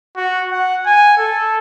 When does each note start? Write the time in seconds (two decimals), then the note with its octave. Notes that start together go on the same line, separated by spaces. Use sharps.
0.17 F#4
0.52 F#5
0.86 G#5
1.18 A4